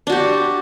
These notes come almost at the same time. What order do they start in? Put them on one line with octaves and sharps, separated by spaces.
D4 F#4 G4